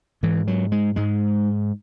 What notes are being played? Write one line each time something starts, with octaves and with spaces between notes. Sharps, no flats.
G#2 E3
F#3
G#3
G#2 G#3